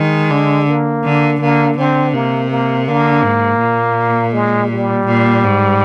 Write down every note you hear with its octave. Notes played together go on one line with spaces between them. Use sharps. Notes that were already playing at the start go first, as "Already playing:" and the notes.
Already playing: D#3 G#3
D3
A#3
D3
D3 A#3
D3 C4
C3 A#3
A#3
D3 A#3
G#2
A#2
G#3
G3
A#2
G#2